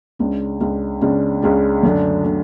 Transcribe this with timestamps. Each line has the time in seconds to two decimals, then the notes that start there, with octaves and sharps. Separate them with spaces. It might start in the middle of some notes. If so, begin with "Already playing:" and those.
0.19 C#2 C#3 G#3 D4
0.60 C#2 C#3 G#3 D4
1.01 C#2 C#3 G#3 D4
1.42 C#2 C#3 G#3 D4
1.83 F#2 D3 A3 D4
2.24 D3 A3 D4